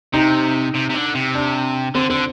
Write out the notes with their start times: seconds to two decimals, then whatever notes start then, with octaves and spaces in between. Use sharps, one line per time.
0.14 C3 D#4
0.74 C3
0.89 C3
0.94 D3
1.15 C3
1.34 D4
1.95 D3 C4
2.09 D3 C4